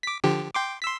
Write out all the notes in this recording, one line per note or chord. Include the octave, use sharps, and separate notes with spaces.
D6 B6
D3 F3 G4
G5 C6 D6
C6 E6 B6